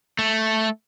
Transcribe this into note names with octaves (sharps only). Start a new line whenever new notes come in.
A3